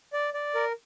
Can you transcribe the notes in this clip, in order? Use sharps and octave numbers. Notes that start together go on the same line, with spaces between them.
D5
D5
A#4